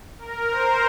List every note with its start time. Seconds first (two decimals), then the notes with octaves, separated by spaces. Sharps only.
0.19 A#4
0.50 C5